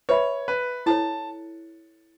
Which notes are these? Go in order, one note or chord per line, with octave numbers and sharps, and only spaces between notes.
B4 C#5 E5 B5
B4
E4 A4 C#5 A5